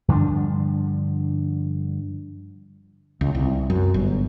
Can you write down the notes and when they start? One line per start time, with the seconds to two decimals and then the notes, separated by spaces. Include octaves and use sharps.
0.08 G2 D3 F3 D4
3.21 C#2
3.35 C2
3.70 F#2
3.94 G1